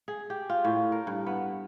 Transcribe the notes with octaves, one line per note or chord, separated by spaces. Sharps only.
G#4
G4
F4
A2
A#4
G2
B3